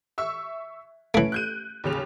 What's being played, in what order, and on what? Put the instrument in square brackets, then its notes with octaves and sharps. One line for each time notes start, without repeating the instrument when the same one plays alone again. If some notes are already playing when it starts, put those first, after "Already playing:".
[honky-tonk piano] E5 C#6 E6
[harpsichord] E3 A3 [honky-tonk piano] C#4 D7
[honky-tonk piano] F#6 G6 D#7
D#2 C#3 F7